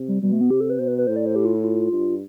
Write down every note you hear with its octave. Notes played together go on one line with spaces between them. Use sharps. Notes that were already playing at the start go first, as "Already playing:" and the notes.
Already playing: C3
G3
B2 G3
A3
B3
C3 G4
A4
B4
B2 C5
B4
B4
A2 C5
D5
C5
G4
F4
E4
F4
G2